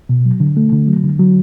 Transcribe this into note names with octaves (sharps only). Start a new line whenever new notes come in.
B2
F#3
D3
A3
D3
F#3
D3
F#3